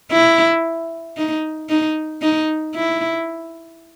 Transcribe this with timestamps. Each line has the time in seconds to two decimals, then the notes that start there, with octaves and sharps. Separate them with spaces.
0.12 E4
1.17 D#4
1.69 D#4
2.22 D#4
2.75 E4